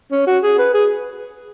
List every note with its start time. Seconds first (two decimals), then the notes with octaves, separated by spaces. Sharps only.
0.12 C#4
0.27 F#4
0.43 G#4
0.58 B4
0.74 G#4